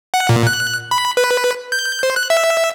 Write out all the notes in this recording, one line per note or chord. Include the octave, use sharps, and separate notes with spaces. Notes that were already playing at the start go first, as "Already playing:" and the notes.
F#5
A#2
F#6
B5
B4
G6
C5
F#6
E5